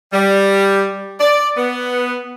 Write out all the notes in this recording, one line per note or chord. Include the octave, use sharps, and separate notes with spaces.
G3
D5
B3